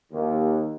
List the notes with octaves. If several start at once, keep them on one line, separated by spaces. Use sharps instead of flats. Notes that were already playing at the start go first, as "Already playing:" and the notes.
D#2